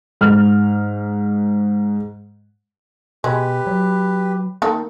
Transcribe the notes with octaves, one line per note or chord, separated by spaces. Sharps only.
G#2 F6
B2 G#3 G4 B4
F#3
D#3 A#3 A4